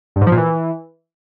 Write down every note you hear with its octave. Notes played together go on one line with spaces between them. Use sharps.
G2
G#2
F3
A#2
E3